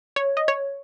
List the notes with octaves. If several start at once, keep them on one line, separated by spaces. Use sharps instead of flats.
C#5
D#5
C#5